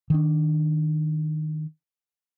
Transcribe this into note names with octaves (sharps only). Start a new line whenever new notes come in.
D#3 D4